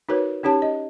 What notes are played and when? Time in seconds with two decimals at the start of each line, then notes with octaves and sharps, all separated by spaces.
0.09 D#4 F#4 A#4 B4 C#5
0.43 C#4 D#4 G4 C#5 A5
0.62 D#5